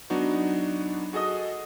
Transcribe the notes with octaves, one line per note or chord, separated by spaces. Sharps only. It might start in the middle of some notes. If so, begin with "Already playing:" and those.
F#3 B3 D4 D#4 F#4
F#4 G#4 A4 D#5 D#6